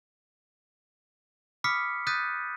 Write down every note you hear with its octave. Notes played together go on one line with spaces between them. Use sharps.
B5 D6 D#6 F6 B6 C#7
D#6 F#6 G6 A6 B6 D#7